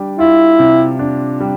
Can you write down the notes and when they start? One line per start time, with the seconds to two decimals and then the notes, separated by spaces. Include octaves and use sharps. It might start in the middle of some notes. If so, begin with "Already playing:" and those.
Already playing: G3 D4
0.19 E4 F4
0.59 C3
0.99 D4
1.40 G3